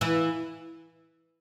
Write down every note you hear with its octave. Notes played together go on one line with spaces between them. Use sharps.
E3 E4